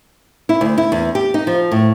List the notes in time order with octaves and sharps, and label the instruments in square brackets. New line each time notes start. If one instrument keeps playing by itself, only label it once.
[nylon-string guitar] E4
D2
E4
E2
G4
D#4
F3
A2